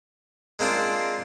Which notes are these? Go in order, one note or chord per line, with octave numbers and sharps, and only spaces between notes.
G#3 A#3 C4 D4 F4